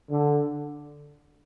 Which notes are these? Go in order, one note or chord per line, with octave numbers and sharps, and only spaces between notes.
D3